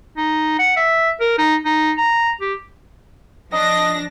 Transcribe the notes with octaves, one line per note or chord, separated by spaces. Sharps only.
D#4
F#5
E5
A#4
D#4
D#4
A#5
G4
F3 D4 D#5 A#6